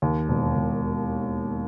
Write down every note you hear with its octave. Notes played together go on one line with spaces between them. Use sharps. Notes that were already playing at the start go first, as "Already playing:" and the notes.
D#2
E1
E1